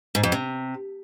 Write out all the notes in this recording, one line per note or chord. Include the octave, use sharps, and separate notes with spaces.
G#2
F2
C3